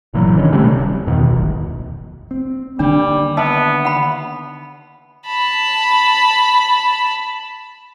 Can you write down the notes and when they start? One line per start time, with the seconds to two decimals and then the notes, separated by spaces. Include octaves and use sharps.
0.14 G1 A#2 E3 F#3
0.34 D3 D#3 C#4
0.52 C3 G3 A3 C#4
0.74 D1
1.06 E2 B2 D#3
1.29 D1 G#1
2.31 C4
2.79 D3 D#3 G3 A#3 D4
3.37 B3 D#5 E5 A5
3.85 F#5 B5
5.27 A5 B5